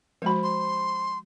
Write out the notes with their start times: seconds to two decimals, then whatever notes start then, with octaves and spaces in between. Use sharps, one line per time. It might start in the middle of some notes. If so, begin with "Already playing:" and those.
0.22 F3 G#3 F#4 C5 B5
0.43 C6